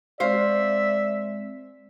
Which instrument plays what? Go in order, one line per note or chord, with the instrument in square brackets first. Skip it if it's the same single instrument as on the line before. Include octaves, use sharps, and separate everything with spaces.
[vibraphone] G#3 C4 [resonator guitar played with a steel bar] C5 F5 [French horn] D5 [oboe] E5